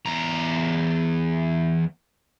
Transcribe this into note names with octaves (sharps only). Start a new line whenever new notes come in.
E2 A#5